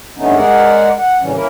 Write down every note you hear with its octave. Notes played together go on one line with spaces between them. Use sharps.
G2 D3 A3 B3 C#4 D#4
G#3 G#4 A#4 D5 F#5
F#5
A2 C#3 E3 G3 C#4
A#3 C#4 E4 A#4